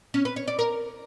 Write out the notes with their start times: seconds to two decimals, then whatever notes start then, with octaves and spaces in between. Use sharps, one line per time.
0.14 C#4
0.25 B4
0.36 C#5
0.48 D5
0.59 A#4